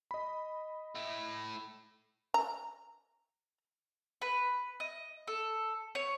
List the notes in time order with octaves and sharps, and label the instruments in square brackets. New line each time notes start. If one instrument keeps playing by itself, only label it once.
[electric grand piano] D#5 B5
[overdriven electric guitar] A3 E4
[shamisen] A#5
[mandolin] B4
D#5
A4
C#5